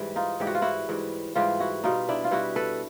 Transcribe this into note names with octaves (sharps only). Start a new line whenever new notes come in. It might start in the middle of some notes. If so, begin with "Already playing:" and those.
Already playing: G#2 E3 G3
D#4 F4
G#2 E3 G3 G4
F#4
F4
E4 F#4
G#2 E3 G3
G#2 E3 G3 F4 G4
E4 F#4
B2 G3 D#4 F4
D4 E4
F4
B2 G3 E4 F#4
A4 B4